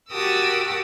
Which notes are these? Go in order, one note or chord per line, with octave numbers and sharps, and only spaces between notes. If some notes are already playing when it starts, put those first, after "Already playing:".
F#4 G4 A#4 A5 D#6 E6